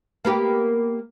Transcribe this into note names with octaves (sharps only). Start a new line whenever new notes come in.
A#3 B3 G4